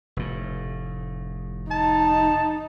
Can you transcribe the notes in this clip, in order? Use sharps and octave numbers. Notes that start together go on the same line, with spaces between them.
F1 A2
D#4 A5